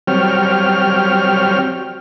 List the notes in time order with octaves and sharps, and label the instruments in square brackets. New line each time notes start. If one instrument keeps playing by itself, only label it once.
[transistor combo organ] F#3 G3 C4 C#5 G5 F6